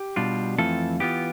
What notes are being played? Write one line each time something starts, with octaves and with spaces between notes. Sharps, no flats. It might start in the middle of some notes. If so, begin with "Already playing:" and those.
Already playing: G4
B2 G3 D4 F4
F2 E3 A3 C4 F4 A4
E3 B3 F4 G4